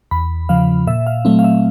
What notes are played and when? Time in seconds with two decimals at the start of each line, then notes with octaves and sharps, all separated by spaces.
0.11 E2 B5
0.49 C#3 F3 F5
0.87 A#2 E5
1.07 F5
1.25 F#3 A3 C4 E5
1.39 F5
1.44 E5